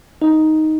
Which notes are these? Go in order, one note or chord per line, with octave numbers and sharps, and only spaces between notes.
D#4